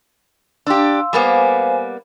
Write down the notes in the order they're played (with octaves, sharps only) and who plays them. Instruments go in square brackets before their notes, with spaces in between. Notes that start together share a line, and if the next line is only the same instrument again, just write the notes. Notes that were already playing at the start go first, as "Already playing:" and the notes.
[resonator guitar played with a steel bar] D4 G4 [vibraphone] F5 C6 E6
[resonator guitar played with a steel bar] G3 A#3 B3 [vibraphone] C5 F5 G#5